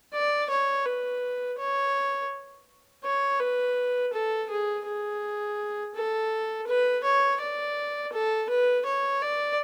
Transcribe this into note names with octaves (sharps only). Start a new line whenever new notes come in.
D5
C#5
B4
C#5
C#5
B4
A4
G#4
G#4
A4
B4
C#5
D5
A4
B4
C#5
D5